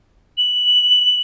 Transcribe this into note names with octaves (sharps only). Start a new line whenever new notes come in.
F#7